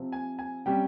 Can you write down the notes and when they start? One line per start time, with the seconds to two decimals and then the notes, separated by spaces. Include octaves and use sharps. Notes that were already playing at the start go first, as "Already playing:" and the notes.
Already playing: C3 F3 C4
0.12 G#5
0.39 G#5
0.66 C3 G3 C#4 G5